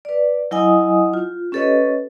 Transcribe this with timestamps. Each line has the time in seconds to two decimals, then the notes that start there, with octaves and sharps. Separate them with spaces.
0.05 B4 D5
0.51 F#3 E4 D#5 F#5 G#5 D#6
1.14 F4
1.52 C#4 G4 A4 B4 C#5 D#5